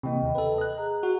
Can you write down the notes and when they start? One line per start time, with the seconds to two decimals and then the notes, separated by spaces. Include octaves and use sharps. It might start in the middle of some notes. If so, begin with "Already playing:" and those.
0.03 C3 E3 A#3 D#5 G5
0.23 D#2 C3
0.35 A4 B4
0.58 D#5 F#6
0.78 G#4 A#5
1.03 F#4